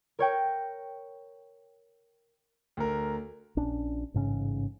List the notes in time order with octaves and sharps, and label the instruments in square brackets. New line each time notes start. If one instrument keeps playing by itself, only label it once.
[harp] A#4 C#5 G5
[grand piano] D2 A#4
[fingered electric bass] A#1 C#4 D4
A1 G#2 C#3 C#4